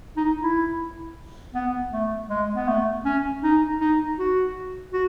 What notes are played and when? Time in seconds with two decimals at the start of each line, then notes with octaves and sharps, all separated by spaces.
0.17 D#4
0.42 E4
1.55 B3
1.93 A3
2.29 G#3
2.56 B3
2.68 A3
3.05 C#4
3.43 D#4
3.80 D#4
4.18 F#4
4.93 F#4